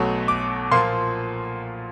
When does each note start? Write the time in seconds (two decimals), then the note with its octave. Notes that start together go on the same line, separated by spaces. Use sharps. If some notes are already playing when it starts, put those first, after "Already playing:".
Already playing: B1 B2 F#3 A3
0.28 D6
0.71 A#2 F3 A#3 C6